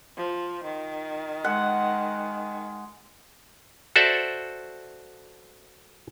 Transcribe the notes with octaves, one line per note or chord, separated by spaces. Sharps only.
F3
D#3
G#3 F#5
F#4 A4 C5 D5 E5